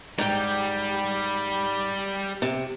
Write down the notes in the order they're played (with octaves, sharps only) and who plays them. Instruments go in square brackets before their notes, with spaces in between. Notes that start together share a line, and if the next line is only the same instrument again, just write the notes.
[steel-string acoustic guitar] G#2 G5 [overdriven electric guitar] G3
[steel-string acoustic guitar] C3